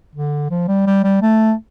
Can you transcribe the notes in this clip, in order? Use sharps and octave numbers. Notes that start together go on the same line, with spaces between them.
D3
F3
G3
G3
G3
A3